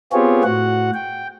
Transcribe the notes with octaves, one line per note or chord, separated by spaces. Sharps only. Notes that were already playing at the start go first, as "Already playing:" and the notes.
B3 C4 F4 G4 G#4 C#5
A2 F#4 F#5
G5